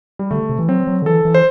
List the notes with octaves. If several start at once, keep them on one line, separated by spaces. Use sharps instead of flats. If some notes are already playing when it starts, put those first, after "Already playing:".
G3
D3 A3
C3
E3
F#3 C4
F#3
D3
E3 A4
E3
C5